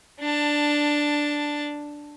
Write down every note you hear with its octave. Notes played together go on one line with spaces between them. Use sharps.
D4 A5